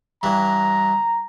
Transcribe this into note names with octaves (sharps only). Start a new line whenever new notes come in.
G2 E3 A#5